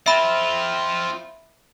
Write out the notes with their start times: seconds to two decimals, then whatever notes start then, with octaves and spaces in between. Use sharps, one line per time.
0.06 C4 F4 E5 B5